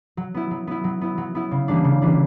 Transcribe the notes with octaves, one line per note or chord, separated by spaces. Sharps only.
F#3
B3 E4
F#3
B3 E4
F#3
B3 E4
F#3
B3 E4
C#3
E3 G3 A#3 D4
C#3
E3 G3 A#3 D4